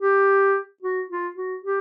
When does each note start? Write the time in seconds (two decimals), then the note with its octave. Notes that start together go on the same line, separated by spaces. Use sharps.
0.01 G4
0.83 F#4
1.10 F4
1.37 F#4
1.64 G4